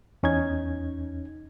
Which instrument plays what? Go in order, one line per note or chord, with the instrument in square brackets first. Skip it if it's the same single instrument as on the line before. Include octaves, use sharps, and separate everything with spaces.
[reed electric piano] E2 C#4 D#4 G#6